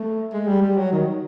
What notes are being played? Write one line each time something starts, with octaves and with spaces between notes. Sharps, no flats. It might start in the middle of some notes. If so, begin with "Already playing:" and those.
Already playing: A3
G#3
G3
G3
F#3
D#3